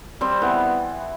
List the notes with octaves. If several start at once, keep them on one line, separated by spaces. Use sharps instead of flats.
G3 C4
E3 B3